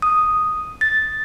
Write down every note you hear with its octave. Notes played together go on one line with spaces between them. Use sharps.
D#6
A6